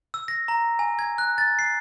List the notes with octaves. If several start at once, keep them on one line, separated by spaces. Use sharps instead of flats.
E6
A#6
A#5
G#5
G#6
F#6
A6
C7